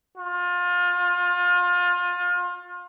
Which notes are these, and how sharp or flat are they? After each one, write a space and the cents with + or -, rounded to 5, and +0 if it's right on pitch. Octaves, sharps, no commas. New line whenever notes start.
F4 +30